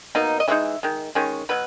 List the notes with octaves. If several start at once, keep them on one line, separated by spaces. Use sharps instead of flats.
B2 A#3 D#4
D#5
E3 G#3 D#4 E5
D#3 G#3
D#3 G#3 C#4
B2 F#3 B4